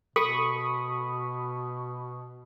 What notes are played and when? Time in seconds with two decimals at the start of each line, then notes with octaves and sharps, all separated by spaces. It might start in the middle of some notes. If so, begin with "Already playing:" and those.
0.16 B2 A4 B5 C#6 D#6